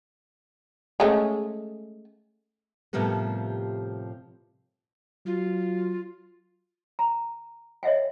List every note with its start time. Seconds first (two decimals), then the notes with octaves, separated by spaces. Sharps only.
1.00 G#3 A3 C#4
2.93 A2 C3 F3 G3 A#3 B3
5.26 F#3 F4
6.99 A#5
7.83 C#5 D#5 E5 F#5 G#5